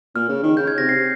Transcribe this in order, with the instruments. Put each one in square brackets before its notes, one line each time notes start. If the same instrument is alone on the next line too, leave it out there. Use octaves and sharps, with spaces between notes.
[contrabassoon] A#2 [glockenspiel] F6
[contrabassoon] C#3
D#3
[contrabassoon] C#3 [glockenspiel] G6
[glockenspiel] G#6
[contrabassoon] C3 [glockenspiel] A#6
[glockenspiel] C7